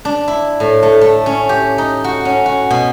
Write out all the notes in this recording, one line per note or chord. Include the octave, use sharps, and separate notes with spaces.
D4
E4
A2
A3
A3
C#4
G4
D#4
F#4
C#4
F#4
B2